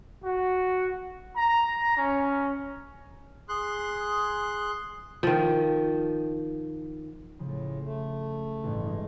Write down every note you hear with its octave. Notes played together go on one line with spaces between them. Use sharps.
F#4
A#5
C#4
G#4 C6 F#6
D#3 F3
A2 C#3 F3
A3
A1 G2
G#3 D#4 F4